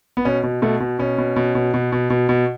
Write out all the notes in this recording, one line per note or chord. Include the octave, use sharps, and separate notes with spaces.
B3
B2 C#4
B2
B2 A3
B2
B2 C#4
B2
B2
B2
B2
B2
B2
B2